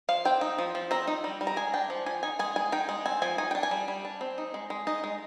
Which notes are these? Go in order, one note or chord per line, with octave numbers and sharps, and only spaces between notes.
F3 F5
C4 G5
D#4
F3
F3
C4 A#5
D#4
G3
G3
A#5
G#3 G#5
D4 G5
F3
F3 G#5
D#4 G#5
G#3 G#5
G#3 G#5
D#4 G5
G#3
C4 G#5
F3 G#5
D#4 G#5
G5
D4
G#5
G3
G3
D4
C4
D#4
G#3
G#3
D#4 D#5
G#3